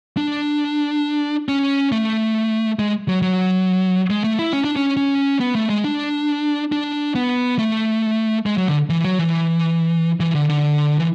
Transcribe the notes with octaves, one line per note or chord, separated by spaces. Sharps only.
D4
C#4
A3
G#3
F#3
F#3
G#3
A3
E4
C#4
D4
C#4
C#4
B3
A3
G#3
D4
D4
B3
A3
G#3
F#3
D3
E3
F#3
E3
E3
D3
D3
E3